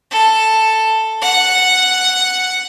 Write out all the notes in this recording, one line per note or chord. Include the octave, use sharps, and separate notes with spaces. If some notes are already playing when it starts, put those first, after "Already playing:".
A4
F#5